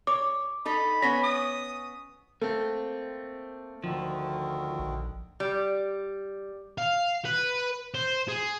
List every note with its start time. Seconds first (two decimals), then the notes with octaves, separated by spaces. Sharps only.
0.07 C#5 D6
0.65 D#4 A4 B5
1.02 B3 C#4 C#5 A#6 B6
1.23 D#6
2.42 A3 A#3 C4
3.84 D2 D3 D#3 F3
4.79 A#1
5.40 G3
6.78 F5
7.25 B4
7.94 C5
8.29 G#4